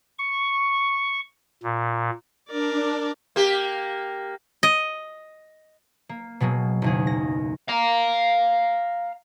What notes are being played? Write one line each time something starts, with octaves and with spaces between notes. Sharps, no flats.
C#6
A#2
D4 A#4 D5
A#3 G4
D#5
A#3
B2 F#3 G#3 A#3
F#1 D#2 G#4
G#3 A#6
F5 A#5